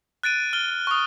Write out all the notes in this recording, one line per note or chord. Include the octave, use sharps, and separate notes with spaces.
F#6 A6 D7 D#7
F6 G7
C#6 D#6